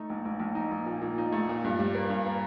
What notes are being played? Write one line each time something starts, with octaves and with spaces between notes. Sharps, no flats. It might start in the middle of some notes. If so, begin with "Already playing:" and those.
Already playing: A3 D#4
A#1
A#1
A#1
D#4
A#1
A#2
A#2
D#4
A3
A#2
G2
G3
A#3
G2
A#3